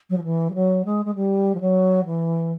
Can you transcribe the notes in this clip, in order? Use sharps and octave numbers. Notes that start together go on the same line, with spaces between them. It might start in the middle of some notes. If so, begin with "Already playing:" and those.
F#3
F3
E3
G3
F#3
G#3
G#3
G3
F3
F#3
E3